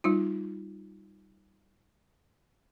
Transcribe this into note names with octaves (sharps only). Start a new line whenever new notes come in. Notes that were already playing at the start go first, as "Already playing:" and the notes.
G3 D#4 F4